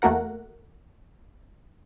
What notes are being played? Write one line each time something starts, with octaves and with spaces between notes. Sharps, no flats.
E2 A3 A#3 F#4 A#4 F#5